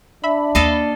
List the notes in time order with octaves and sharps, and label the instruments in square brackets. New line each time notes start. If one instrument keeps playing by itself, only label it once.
[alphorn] D4 [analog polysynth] E5 B5
[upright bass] D#2 [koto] A4 D#5 F5